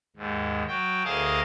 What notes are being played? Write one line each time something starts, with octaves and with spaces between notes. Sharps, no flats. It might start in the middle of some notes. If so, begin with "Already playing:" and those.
D#2 G#2
F#3 G5
D2 G#4 A#4 D#5 F5 A5